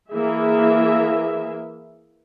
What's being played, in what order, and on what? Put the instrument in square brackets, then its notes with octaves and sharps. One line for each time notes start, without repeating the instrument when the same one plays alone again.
[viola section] E3 A#3 G#4 E5